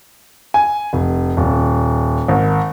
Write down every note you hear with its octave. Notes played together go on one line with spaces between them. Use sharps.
G#5
F1
D#1
G#1